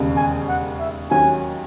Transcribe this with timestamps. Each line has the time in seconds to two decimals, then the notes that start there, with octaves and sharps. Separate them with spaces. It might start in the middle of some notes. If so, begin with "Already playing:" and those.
Already playing: E1 D#2 C#3
0.17 G#5
0.48 F#5
0.80 E5
1.11 D#2 D#3 F#3 C#4 G#5